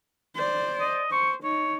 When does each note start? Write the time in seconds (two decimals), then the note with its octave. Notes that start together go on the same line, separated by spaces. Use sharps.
0.35 C5 D5
0.80 D#5
1.11 C5 C#6
1.44 D#4 C#5